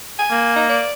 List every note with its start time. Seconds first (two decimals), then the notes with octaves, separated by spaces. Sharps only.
0.19 G#5
0.31 A#3
0.56 D#4
0.69 D5